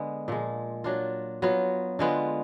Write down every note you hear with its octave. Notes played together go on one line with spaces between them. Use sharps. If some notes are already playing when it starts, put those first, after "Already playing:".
Already playing: D3 G#3 B3
A#2 F3 G#3
F#3 D4 F4
F#3 B3 F4
D3 G#3 B3 F4